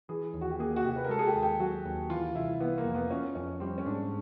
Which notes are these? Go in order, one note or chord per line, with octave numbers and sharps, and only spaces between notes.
E3 G#4
D#2
F#4
G4
A#3 G#4
F#4
C3 G4
B4
A#4
G#3 A4
G#4
G4
D#2
G4
F#3 F#4
D#2
E3 F4
C2 E4
E3 B3
A#3
F2
B3
F3 C#4
F2 C#4
G3 C4
C#4
G#2 D4